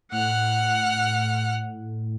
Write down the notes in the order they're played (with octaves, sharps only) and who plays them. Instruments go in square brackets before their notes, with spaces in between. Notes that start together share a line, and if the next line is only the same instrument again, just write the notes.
[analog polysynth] A2 [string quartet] F#5 F6 F#6